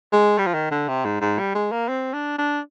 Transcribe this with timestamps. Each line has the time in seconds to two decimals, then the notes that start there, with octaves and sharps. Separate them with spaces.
0.12 G#3
0.39 G3
0.46 F3
0.54 D#3
0.71 D3
0.88 C3
1.05 G#2
1.21 G#2
1.39 G3
1.55 G#3
1.72 A#3
1.89 C4
2.14 D4
2.38 D4